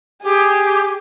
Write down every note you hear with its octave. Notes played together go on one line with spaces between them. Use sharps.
G4 G#4